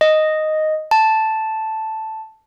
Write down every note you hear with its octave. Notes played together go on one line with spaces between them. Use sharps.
D#5
A5